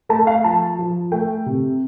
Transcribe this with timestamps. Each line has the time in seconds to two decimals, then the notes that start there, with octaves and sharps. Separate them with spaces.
0.09 A3 A5
0.27 F5
0.44 F3 A5
0.79 F3
1.12 A3 G5
1.46 C3